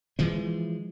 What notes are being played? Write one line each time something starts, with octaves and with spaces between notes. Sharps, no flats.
E3 F3 G#3